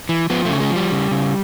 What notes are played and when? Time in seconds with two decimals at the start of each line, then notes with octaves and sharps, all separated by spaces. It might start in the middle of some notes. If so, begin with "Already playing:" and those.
0.09 E3
0.30 F3 B3
0.45 C#3 A3
0.60 G#3
0.70 F3
0.76 G3
0.92 C#3
1.11 C#3